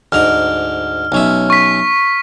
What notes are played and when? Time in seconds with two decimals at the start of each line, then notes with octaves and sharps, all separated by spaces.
0.12 D2 G#2 A#5 F6
1.12 B1 C#4 E5
1.50 C#6 B6